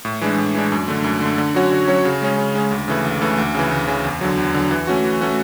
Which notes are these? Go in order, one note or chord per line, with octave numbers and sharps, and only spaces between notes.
A2
E3 G#3 D4
A2
E3 G#3 D4
F#2
D3 A3
F#2
D3 A3
D3
F#3 C#4 F#4 C#5
D3
F#3 C#4 F#4 C#5
C#3
G#3 C#4
C#3
G#3 C#4
D2
C#3 E3 A3
D2
C#3 E3 A3
D2
C#3 E3
D2
C#3 E3
E2
D3 F#3
E2
D3 F#3
E3
A3 C#4 F#4
E3
A3 C#4 F#4